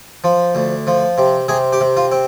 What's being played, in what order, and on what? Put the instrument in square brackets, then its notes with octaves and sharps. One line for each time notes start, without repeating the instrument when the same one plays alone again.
[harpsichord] F3
D2
F3
C3
C3 G#4
G4
C3
F4
C4